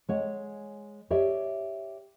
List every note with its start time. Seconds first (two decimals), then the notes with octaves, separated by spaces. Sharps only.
0.09 G#3 C#5 F#5
1.10 G4 C#5 D5 E5